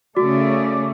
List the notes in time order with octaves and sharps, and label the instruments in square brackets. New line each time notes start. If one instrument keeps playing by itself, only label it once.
[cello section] C#3 A3 [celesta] F#4 [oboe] D5